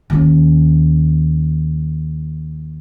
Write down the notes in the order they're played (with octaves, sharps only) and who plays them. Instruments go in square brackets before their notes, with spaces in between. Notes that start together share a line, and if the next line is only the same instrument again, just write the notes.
[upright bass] D#2 C#4